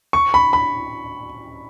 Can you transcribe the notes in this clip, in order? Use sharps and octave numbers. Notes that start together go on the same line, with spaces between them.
C#6
B5
B5